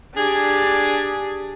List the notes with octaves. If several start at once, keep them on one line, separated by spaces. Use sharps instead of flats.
D4 G4 G#4